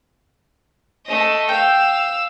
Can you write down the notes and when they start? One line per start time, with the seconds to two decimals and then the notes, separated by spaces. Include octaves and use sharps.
1.06 A3 D#5
1.49 F5 G5 E6